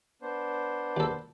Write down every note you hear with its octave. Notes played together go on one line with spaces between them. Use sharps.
B3 D4 C5
D#2 A4